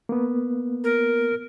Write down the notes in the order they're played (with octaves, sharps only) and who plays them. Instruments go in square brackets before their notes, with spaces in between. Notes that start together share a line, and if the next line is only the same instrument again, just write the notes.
[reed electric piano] A#3 B3
[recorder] A#4